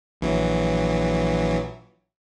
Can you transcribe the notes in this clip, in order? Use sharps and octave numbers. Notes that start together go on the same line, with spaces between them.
A#1 E3 F#3